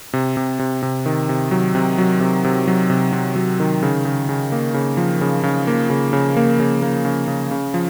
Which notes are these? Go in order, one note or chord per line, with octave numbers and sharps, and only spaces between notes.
C3
C3
C3
C3
D#3
C3
F#3
C3
F#3
C3
C3
F#3
C3
C3
F#3
D#3
C#3
C#3
C#3
A#3
C#3
F3
C#3
C#3
A#3
C#3
C#3
A#3
C#3
A#3
C#3
C#3
C#3
F3